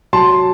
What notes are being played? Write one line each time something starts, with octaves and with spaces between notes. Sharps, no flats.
F#3 A5 C6